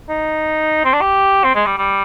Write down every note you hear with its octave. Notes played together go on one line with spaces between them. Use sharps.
D#4
C4
D4
G4
C4
G#3
G3
G3